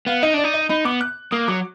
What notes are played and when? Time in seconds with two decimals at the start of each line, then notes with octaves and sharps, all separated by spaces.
0.07 B3 F5
0.23 D#4 D#5
0.34 D4 D5
0.44 D#4
0.54 D#5
0.69 D#4 B5
0.85 B3 D6
1.01 F#6
1.31 A#3 D#6
1.48 F#3 D6